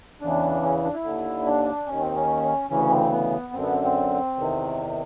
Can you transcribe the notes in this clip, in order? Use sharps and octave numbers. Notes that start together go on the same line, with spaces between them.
E2 C#3 E3 D4
C#4
D4
E4
D#2 D3
D4
D#2 D#3 C#4
C4
C#4
D2 C#3 E3 C#4
C4
B3
F#2 D3 C4
B3
C4
C4
E2 C3 D#3